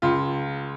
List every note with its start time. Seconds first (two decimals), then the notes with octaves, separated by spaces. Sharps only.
0.02 C#2 F4